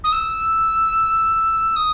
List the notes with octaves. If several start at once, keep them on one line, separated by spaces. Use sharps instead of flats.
D#6
E6
D#6